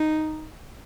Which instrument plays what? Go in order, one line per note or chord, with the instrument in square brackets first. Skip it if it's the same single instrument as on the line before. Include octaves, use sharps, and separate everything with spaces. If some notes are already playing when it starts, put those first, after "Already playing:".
Already playing: [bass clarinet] D#4